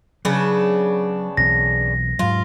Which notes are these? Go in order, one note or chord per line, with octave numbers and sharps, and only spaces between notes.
C#3 F#3 B3 D4
B1 E3 C4 A#6
G#2 F#3 F4